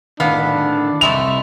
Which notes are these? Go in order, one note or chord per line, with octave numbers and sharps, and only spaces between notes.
A2 D3 D#3 B3 D4 F5
C2 C#3 E3 G#3 A3 E5 F7